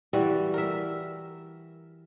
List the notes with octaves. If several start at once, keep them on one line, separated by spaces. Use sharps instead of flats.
E3 G3 F#4
A#4 E5